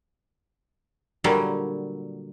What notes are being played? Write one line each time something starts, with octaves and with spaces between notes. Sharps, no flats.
A#2 D3 F#3 G3